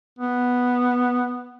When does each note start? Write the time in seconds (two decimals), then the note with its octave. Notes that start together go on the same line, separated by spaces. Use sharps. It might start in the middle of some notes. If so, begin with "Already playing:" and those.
0.19 B3